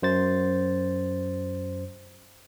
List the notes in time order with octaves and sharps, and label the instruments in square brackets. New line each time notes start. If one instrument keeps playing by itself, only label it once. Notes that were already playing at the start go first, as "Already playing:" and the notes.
[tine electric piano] F#2 C5 A6